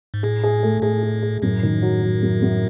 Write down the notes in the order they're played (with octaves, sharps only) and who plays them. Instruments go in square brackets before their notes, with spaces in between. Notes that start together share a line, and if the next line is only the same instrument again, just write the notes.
[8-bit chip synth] G#2
[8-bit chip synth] A2 [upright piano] G#4
[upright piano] G#4
A3
[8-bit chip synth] A2 [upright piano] G#4
[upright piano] G#4
G#4
[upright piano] F#2 [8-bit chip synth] A2
[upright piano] D#3
F#3
F#3
F#2
F#2